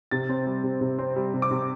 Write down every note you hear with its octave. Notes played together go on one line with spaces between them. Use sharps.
C3 A6
C4
G3
C3
C3
C4
G3
C3
D6
C3